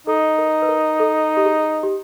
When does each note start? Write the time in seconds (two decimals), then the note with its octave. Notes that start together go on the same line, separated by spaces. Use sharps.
0.07 D#4 A4
0.38 A#4
0.62 B4
0.69 A#4
1.00 A4
1.37 G4
1.45 G#4
1.83 G4